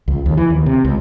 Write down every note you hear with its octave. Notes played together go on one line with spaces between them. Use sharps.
C#2
D#2
E3
D#2
C3
C#2